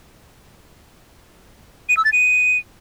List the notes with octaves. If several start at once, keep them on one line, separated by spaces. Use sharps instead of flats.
D#7
E6
A6
D#7